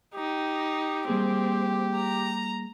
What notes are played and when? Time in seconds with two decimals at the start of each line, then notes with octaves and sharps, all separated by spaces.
0.15 D#4 G4
1.08 G3 A#3 C4 G#4
1.96 A#5